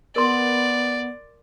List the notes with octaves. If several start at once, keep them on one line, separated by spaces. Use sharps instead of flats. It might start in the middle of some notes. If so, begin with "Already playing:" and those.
B3 A#4 D5 C6